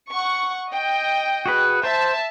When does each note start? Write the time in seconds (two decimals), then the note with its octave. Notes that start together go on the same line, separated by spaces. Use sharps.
0.11 F#5 C#6
0.72 D#5 G5
1.46 F#4 G#4 B4
1.84 C5 E5 A5